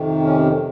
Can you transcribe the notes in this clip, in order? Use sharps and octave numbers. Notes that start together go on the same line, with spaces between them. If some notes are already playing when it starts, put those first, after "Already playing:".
Already playing: F2 C3 D#3
C#4